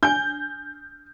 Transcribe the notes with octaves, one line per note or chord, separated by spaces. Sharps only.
D4 G#5 G6